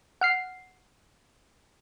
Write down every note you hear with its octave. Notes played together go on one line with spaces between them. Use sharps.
F#5 F6 C7